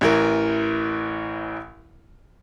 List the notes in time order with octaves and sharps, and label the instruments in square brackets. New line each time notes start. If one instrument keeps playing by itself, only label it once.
[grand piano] A1 E3 A#4